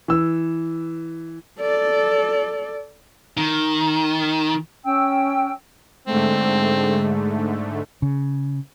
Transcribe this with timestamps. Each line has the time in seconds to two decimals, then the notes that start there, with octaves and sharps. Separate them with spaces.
0.08 E3 E6
1.61 A4 D5
3.37 D#3
4.84 C#4 G5 E6
6.07 G#2 D3 G#3 A3 C4
8.02 C#3